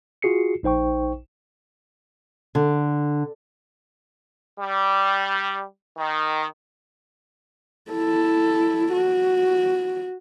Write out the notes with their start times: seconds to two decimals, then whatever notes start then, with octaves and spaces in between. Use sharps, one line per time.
0.22 F4 F#4 G#4 C7 C#7
0.63 A#1 D#4 C5 G5 C#6
2.55 D3
4.59 G3
5.98 D#3
7.91 E4 A4
8.92 F#4